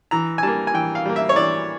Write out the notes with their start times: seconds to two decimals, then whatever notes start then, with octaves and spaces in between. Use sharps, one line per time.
0.11 E3 A#5
0.38 G#5
0.43 G3 A#3 A5
0.67 G#5
0.74 E3 G5
0.95 F5
1.05 G3 A#3
1.16 E5
1.29 C#5
1.36 E3 D5